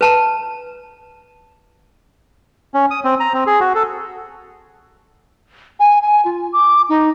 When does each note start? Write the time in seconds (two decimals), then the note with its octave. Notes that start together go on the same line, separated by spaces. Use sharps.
0.01 B4 A5 A#5
2.74 C#4
2.91 D#6
3.04 C4
3.20 A#5
3.34 C4
3.47 G#4
3.60 F#4
3.75 A4
5.80 G#5
6.02 G#5
6.25 F4
6.53 D6
6.89 D#4